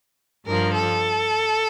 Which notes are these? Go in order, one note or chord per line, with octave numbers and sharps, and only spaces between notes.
G2 F3 A#4
A4